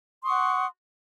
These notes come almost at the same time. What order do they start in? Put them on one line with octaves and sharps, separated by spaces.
C6 D#6 C#6 F#5